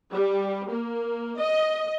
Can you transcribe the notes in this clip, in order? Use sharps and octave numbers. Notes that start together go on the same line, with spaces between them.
G3
A#3
D#5